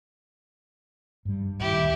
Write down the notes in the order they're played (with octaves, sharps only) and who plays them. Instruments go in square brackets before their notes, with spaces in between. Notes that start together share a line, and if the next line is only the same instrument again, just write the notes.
[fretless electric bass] G2 G3
[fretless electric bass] D2 A#2 D#3 [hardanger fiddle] E4 G4